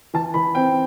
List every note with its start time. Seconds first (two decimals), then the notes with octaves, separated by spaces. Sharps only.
0.14 E3 A5
0.34 E3 B5
0.55 C4 G5